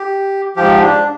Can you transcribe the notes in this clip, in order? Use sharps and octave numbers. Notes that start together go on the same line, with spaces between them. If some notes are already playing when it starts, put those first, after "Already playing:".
Already playing: G4
G#2 F3 G4
D4